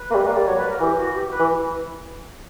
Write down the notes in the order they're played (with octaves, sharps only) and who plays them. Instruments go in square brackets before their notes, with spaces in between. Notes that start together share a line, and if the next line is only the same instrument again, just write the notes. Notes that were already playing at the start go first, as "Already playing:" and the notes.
Already playing: [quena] B4
[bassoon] A#3
G3
A#3
[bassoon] G3 [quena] D5
[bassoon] F#3 [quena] C#5
[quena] B4
A#4
[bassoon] E3 [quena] G4
[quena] F#4
G4
B4
[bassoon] E3